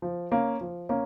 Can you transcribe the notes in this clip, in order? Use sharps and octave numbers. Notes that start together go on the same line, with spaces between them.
F3
A#3 C#4
F3
A#3 C#4